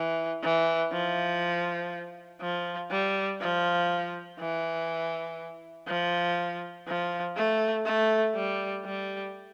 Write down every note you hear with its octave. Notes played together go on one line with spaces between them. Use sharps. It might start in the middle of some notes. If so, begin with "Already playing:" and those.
Already playing: E3
E3
F3
F3
G3
F3
E3
F3
F3
A3
A3
G3
G3